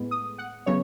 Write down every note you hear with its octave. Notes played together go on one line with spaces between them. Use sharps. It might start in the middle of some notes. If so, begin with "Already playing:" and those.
Already playing: A2 G#3 B3
D#6
F#5
C#3 F#3 B3 C#5